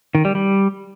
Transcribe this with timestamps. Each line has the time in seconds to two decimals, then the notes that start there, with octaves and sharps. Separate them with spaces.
0.15 D#3
0.25 G3
0.35 G3